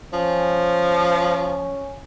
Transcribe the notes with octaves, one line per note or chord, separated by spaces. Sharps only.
F3 C#4